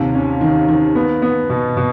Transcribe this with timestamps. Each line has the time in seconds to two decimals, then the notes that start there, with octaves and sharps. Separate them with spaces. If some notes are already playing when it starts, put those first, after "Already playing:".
Already playing: D#2 C3
0.15 C#4
0.41 D#3
0.68 D#3
0.95 B3
1.22 B3
1.50 B2
1.77 B2